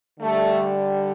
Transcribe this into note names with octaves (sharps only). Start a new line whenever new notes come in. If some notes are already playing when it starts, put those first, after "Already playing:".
D3 G3 A3